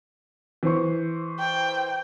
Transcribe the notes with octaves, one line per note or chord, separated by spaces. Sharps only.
E3 C5 C#6
G5